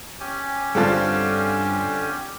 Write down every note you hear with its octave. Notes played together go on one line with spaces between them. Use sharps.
C#4 G4 G#5
G2 D3 C4 F4 A5